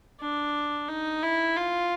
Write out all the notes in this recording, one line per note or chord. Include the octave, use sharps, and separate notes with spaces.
D4
D#4
E4
F4